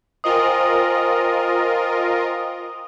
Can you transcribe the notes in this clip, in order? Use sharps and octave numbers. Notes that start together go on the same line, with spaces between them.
F4 A#4 C5 D#5 G5 G#5 D#6